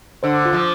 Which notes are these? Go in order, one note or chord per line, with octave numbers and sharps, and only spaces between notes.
D3 C5
F4
F3